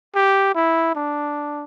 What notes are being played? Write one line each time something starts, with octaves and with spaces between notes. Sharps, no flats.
G4
E4
D4